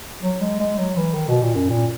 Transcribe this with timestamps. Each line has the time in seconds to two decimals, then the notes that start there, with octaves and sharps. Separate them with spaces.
0.23 F#3
0.41 G#3
0.60 G#3
0.78 F#3
0.97 E3
1.14 D#3
1.28 B2
1.43 A#2
1.55 F#2
1.70 A#2